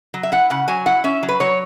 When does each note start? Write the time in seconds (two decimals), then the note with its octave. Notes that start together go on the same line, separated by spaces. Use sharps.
0.14 F#3
0.23 E5
0.32 E4 F#5
0.50 C#3 F#5
0.68 F#3 G#5
0.86 E4 F#5
1.04 C#4 E5
1.23 F#3
1.29 B4
1.40 F#3 C#5